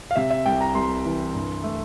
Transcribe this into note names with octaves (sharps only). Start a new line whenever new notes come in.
F5
C3 E5
E5
C2 G5
A#5
C2 C6
E3
G2
A3